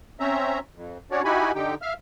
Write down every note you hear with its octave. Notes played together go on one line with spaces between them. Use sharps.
C4 C#4 E5 A#5
F2
C#4 D4 F#4 C#5 D5
D#4 E4 F#4 G4 G#5 B5
D3 D#4 G4 G5
E5 F5 F6